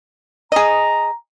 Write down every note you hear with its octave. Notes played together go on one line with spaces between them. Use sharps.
G#4 D#5 A#5